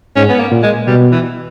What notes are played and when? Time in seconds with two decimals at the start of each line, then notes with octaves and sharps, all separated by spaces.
0.16 G#2 C#4
0.29 B3
0.39 A#3
0.51 A#2
0.63 G#3
0.87 B2 G3
1.12 E3